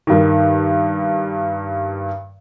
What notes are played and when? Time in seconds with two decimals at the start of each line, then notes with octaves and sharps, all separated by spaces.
0.07 G2 D#3